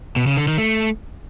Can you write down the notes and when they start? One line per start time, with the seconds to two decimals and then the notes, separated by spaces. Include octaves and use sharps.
0.16 B2
0.27 C#3
0.37 D3
0.47 D#3
0.58 A3